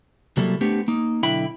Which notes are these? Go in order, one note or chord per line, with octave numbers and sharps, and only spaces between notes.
C3 F#3 G3 A#3 E4 A4
A3 B3 C4 D4 G4
A#3 D#4
B1 D3 E4 E5 G5 B5